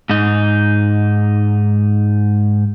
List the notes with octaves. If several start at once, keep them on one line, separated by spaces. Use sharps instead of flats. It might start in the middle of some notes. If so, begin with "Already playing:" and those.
G#2 D#4